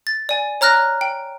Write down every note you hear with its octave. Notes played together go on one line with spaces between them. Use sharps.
A6
D5 G#5
C#5 A#5 F6 F#6 A#6
G5